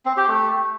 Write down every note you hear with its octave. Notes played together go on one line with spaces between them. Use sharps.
C4
G4
A3